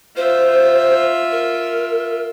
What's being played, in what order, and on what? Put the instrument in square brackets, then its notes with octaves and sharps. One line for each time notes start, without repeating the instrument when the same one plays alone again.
[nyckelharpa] F4 E5 [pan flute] C5
[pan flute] A#4